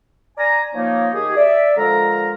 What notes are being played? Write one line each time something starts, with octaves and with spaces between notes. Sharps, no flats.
D5 G#5 A#5
F3 A#3 D#4 C#5
D#3 G4 G#4
D5 E5
D3 F3 G#3 A4 A#4 A#5